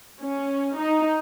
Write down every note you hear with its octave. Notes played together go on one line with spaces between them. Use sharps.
C#4
D#4